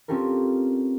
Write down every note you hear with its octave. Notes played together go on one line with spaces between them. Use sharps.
C4 C#4 F4 G4 A4 A#4